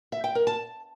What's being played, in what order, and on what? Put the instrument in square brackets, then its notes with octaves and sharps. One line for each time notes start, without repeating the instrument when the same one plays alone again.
[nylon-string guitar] E5
G5
A#4
A5